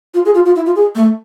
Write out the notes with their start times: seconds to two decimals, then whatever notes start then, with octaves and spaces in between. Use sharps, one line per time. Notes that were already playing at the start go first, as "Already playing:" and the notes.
0.14 F4
0.25 G#4
0.35 F4
0.46 F4
0.56 E4
0.66 F4
0.76 G#4
0.95 A3